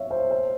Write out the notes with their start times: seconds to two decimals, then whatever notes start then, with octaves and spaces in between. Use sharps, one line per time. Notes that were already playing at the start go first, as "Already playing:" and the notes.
Already playing: C#5 E5 F5
0.11 C5
0.31 C5